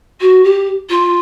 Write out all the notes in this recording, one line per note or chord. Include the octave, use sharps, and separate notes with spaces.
F#4
G4
F4